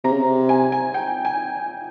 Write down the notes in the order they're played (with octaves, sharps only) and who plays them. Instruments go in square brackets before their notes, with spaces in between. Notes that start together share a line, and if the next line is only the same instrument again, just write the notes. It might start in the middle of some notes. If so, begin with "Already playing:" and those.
[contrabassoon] C3 [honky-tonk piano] A#5
[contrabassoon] C#3
C3
[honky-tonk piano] G#5
G#5
G5
G#5